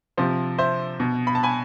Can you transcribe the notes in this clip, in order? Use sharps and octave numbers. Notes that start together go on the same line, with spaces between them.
C3 F3 C5
C5 E5
B2
B5
A5
G#5 B5